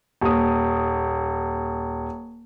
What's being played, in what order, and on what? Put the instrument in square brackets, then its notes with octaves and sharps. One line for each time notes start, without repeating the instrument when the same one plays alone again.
[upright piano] D#1 D#6